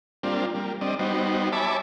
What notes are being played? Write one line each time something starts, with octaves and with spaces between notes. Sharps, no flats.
G3 A#3 C4 D4 F4
G3 A#3
G3 C4 D4 D#5
G3 B3 D#4 F#4 C5
C#5 E5 G#5 A5 B5 D6